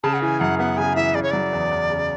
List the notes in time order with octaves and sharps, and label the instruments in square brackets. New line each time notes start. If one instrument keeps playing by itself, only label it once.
[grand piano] C#3 [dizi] A5
[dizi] F#5
[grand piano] E3 [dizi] G#5
[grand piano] F#2 [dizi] F#5
[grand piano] B3 [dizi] F#5
[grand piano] C#3 [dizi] G#5
[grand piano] E3 [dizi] E5
[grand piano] C#3 [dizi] D5
[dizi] C#5
[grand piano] F#3 [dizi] D5
[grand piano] E2
E2
C#3